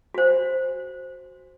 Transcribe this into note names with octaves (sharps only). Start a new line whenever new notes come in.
F#4 C5